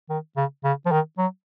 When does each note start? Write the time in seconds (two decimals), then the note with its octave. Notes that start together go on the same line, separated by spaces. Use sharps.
0.10 D#3
0.37 C#3
0.64 C#3
0.86 F3
0.92 D#3
1.18 F#3